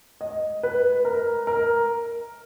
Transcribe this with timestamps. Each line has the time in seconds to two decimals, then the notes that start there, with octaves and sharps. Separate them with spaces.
0.21 D#5
0.63 B4
1.05 A#4
1.47 A#4